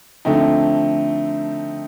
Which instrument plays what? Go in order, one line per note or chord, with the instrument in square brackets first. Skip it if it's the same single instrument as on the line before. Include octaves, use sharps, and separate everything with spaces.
[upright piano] D3 F3 A3 C4 D#4